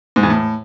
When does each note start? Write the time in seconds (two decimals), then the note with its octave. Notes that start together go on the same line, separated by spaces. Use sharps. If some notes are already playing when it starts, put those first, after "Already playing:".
0.16 G#2
0.23 E2
0.30 A2